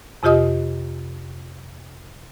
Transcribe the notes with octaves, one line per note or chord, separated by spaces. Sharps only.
F2 C3 F4 G4 D#5 D#6